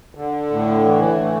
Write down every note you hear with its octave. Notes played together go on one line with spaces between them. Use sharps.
D3
A2
E3
A3